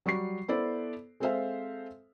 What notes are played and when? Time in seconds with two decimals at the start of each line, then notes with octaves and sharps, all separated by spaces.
0.06 F#3 G3 F#4 C#6 C7
0.48 B3 E4 A4 C5 D5
1.20 G#3 C4 A4 C5 E5 F5